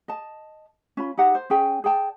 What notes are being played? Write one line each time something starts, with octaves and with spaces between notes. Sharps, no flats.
D#5 A5
C#4 F4 B5
D#4 G4 F#5
C5
C#4 G#4 G5 G#5
G#4 D5 G5 A5